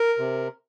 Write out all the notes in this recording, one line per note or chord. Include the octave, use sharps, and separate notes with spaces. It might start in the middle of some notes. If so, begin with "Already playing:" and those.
Already playing: A#4
C3